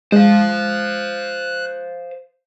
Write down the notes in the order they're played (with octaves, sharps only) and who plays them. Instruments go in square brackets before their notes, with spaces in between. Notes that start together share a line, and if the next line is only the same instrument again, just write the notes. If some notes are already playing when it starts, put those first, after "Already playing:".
[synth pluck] G#3 [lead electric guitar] C5 F5 [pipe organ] F#6